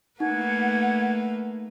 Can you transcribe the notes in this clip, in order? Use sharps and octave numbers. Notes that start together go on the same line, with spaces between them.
A3 A#3 D#4 B4 F#5 G#6